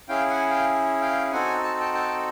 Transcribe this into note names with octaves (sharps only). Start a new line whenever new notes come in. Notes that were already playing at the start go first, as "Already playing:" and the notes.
C#4 E4 G#4 F5 G5
F#5 G#5
F5 G5
F5 G5
C4 D#4 F#4 A4 F#5 G#5
A5
G5 A5
G5 A5